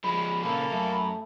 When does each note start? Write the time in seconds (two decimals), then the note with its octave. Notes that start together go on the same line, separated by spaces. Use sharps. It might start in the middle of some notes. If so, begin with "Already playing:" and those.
0.04 F3 G#3 B5
0.43 A#2 C#3 A#3 A4
0.71 F#2 A3